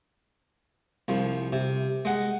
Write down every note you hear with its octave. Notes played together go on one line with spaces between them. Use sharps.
C2 F3
C3
G#3 F#5